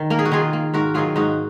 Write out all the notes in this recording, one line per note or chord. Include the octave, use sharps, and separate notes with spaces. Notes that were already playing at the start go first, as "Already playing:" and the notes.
Already playing: D#3
A#3 A#4
G#4
F#4
D#3 F4 G#4
A#3
G#2 F#4 A#4
D#3 F#3 F4 G#4
G#2 D#4 F#4